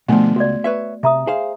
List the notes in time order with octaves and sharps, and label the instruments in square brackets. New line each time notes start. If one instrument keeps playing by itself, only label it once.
[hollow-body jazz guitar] B2 D3 F3 [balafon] A3 B3
[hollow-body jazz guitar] C#2 [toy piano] F#4 D5
[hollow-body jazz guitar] B4 C#5 E5
[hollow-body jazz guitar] C3 [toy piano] E5 A#5 D#6
[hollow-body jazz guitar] G#4 C5 F5